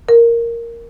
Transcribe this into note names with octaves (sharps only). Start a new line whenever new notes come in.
A#4